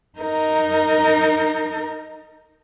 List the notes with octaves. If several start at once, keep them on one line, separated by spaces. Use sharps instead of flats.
D#4 A#4